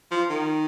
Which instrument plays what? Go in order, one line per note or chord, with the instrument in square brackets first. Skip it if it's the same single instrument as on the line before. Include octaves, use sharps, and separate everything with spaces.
[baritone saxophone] F3
D#3